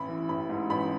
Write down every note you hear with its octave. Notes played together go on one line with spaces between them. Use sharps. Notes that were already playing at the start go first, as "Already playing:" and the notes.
Already playing: A1 B5
E3
A1 B5
G#2
A1 B5